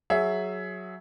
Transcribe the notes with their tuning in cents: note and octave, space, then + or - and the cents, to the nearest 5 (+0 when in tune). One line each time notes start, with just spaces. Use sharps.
F#3 +0 G#4 +15 E5 +0